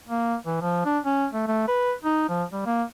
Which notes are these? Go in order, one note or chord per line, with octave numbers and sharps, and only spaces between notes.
A#3
E3
F3
D4
C#4
A3
A3
B4
D#4
F3
G3
A#3